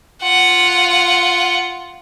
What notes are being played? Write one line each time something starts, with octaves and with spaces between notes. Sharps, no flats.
F4 F#5